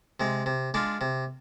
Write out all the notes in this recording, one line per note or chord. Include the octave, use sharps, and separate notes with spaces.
C3 G#3
C3
G#3 D4 F4
C3